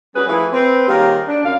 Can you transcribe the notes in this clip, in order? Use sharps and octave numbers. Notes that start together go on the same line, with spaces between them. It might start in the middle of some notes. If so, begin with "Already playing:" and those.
G3 C#4 F#4 G#4 B4
E3 F3 A3 E4 G#4 B4
C4 B4
D#3 G3 A#3 F4 G#4 C#5
D4
F#2 F5